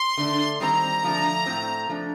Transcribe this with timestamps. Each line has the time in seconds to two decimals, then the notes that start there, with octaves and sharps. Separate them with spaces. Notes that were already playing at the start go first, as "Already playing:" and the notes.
Already playing: C6
0.17 D3 A3 D4
0.60 D#3 G3 C4 A#5
1.03 D3 F3 A3 D4
1.46 A2 A3 C4
1.89 F3 A3 D4